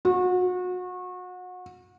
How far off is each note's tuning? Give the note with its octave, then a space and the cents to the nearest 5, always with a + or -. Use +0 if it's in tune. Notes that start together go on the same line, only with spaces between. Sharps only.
F#4 -30